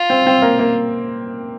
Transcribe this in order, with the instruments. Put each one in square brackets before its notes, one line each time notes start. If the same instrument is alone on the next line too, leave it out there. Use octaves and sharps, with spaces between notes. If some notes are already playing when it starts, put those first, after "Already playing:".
Already playing: [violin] F4
[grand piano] C4
C4
A#3
A#3